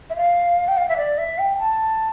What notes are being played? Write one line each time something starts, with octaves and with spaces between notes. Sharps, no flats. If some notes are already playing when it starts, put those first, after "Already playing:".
E5
F5
G5
F5
E5
D5
E5
G5
A5